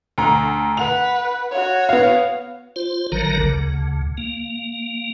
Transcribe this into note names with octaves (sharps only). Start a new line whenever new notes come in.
D2 A#5
B4 F#5 F7
F#4 C#5
B3 F5
F4 C5
A1 D3 D#3 F#3 A#4 A#5
D2 C#3
A#3